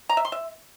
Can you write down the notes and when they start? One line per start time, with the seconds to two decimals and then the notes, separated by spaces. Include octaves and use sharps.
0.09 A#5
0.17 E5
0.25 C6
0.32 E5